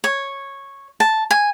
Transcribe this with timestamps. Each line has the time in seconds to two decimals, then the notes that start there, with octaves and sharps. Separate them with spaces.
0.04 C#5
1.00 A5
1.31 G#5